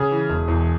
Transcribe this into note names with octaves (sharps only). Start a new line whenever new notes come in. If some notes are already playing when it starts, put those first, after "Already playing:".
Already playing: C#3 G#4
E3
E1
E2